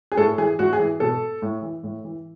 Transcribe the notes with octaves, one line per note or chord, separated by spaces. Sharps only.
G#4
A2 A4
E3 G#4
A2 F#4
G#4
E3
B2 A4
A2
E3
A2
E3